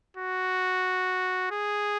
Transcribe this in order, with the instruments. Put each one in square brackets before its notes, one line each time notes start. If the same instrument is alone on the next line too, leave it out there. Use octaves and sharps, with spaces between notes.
[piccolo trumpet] F#4
G#4